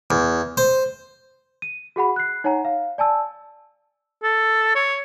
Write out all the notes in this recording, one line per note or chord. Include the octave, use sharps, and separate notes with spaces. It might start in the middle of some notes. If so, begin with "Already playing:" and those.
E2
C5
D#7
F#4 G#4 F#5 B5
F#6 C7
D#4 C#5 F#5 G#5 A#5
F5
D5 G#5 A5 E6
A4
C#5